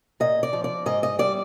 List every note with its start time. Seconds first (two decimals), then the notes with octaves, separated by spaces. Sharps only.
0.20 A#2 D#5
0.43 D5
0.53 F3
0.64 D5
0.86 G#2 D#5
1.03 D#5
1.19 G3 D5